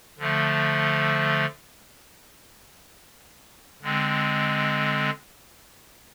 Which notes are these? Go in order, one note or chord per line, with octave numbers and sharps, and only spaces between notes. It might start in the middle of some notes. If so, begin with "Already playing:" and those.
D3 F3 A3
D3 G#3 C4